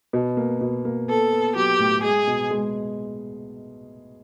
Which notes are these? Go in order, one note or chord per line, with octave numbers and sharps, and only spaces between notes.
B2
A#3
B2
A#3
B3 A4
B3
F#3 G4
A2
G#3 G#4
B2
G#3